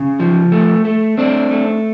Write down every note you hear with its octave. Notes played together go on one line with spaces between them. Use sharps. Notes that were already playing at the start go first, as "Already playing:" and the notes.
Already playing: C#3
F3
A3
A3
A3 C4 D4
A3